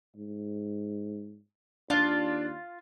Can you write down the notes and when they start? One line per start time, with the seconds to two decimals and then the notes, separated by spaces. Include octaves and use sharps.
0.16 G#2
1.90 D#2 D4 F4 D5